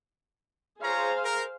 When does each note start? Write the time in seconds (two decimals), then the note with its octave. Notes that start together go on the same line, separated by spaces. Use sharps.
0.83 F4 G#4 C5 C#5 F5 A#5
1.23 A#4